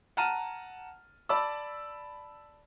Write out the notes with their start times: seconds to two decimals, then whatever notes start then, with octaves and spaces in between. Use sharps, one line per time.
0.17 F#5 A5 A#5 F6 D#7
1.29 D5 A5 B5 E6